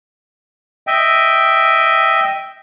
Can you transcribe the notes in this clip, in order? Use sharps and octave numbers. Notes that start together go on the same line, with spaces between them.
D#5 E5 G5